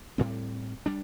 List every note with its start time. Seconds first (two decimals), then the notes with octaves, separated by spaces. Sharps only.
0.18 A2 G3 C4
0.86 G3 D4